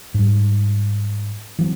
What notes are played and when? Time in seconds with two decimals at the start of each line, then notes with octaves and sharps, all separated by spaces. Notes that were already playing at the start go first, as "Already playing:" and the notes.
0.14 G#2 G3
1.59 E3 F#3 C4